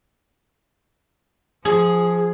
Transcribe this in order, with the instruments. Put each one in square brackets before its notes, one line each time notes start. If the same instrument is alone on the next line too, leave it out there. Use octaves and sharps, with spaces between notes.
[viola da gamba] F3 [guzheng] G#4